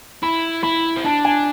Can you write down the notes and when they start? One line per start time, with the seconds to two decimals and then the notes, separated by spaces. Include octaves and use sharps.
0.23 E4 B5
0.63 E4 B5
0.97 C4
1.04 D4 A5
1.25 G#5